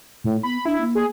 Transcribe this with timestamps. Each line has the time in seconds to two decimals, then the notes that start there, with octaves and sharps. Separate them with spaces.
0.24 A2
0.43 B3 B5
0.65 D4 E4
0.81 A#3
0.95 G#4